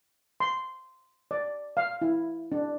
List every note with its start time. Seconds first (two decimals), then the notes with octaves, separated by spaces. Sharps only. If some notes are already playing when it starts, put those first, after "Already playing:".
0.40 C6
1.31 D5
1.77 F5
2.02 E4
2.52 D4